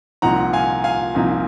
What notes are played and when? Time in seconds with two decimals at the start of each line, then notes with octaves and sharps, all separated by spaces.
0.22 C2 A#2 F3 C4 D#4 F#5 A#5
0.53 F5 G#5
0.84 F5 G#5
1.15 C2 A#2 F3 C4 D#4